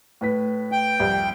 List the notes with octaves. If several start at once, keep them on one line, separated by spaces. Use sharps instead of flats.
A2 B4 B6
G5
C2 F2